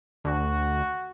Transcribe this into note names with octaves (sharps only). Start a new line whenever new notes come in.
D2 F#4